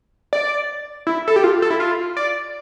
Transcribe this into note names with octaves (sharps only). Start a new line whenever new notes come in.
D5
E4
A4
G4
F4
A4
E4
F4
D5